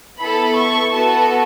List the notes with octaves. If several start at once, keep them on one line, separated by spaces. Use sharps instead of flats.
B3 E4 A4 B5
C#6
B3 F#4 A4 A5